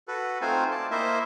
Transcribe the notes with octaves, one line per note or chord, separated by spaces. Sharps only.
F#4 A4 B4
A3 C4 D#4 F4 C5 G#5
D5 A5
A#3 E4 C5 D#5 E5